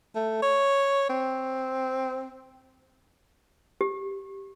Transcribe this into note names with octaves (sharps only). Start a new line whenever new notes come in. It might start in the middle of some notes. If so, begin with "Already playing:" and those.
A3
C#5
C4
G4